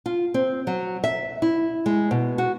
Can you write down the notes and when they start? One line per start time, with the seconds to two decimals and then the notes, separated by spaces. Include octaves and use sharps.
0.06 F4
0.34 C4
0.67 F#3
1.04 E5
1.42 E4
1.86 G#3
2.11 B2
2.38 F#4